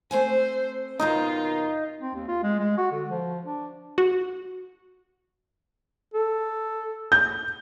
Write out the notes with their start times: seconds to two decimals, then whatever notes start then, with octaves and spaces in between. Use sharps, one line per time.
0.11 A3 C4 C5 G#5
1.00 D#2 B2 D#3 D#4 F4
2.01 C4
2.15 D#2
2.28 F4
2.43 G#3
2.60 G#3
2.78 F#4
2.92 D3
3.11 F3
3.45 D4
3.98 F#4
6.14 A4
7.12 G6